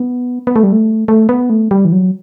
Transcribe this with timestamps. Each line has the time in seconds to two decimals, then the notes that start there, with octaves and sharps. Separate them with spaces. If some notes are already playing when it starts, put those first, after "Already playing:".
Already playing: B3
0.47 B3
0.56 A3
0.63 G3
0.72 A3
1.08 A3
1.29 B3
1.50 A3
1.71 G3
1.85 E3
1.92 F#3